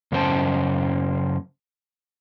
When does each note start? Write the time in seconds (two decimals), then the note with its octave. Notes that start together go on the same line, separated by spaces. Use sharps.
0.12 F#2 C#3 C#4 C5 G5 A5